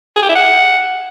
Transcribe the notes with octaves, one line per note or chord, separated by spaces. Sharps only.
G#4
G4
E4
F#5